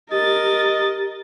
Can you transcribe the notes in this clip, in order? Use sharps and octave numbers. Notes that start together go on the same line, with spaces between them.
G4 A#4 D#5 A6